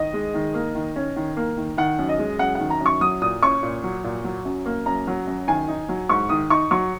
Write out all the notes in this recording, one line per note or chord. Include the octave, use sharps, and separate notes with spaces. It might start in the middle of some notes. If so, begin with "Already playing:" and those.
Already playing: D#3 D#5
G#3
D#3
A#3
D#3
C#4
D#3
A#3
D#3
D#3 F#5
F#2
D#5
G#3
F#2 F#5
D#3 F#5
A#5
F#2
C#6
F#3 D#6
A#2 D#6
C#4 C#6
A#2
F#3
A#2
F#3
F#2
A#3
F#2 A#5
F#3
F#2
D#3 G#5
D#4
F#3
G#2 C#6
D#3 D#6
D#4 C#6
F#3 C#6